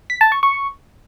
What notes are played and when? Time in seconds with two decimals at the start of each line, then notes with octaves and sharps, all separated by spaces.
0.10 B6
0.21 A5
0.32 C#6
0.43 C#6